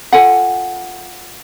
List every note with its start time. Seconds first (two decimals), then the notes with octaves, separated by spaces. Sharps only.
0.12 F4 A4 F#5 G#5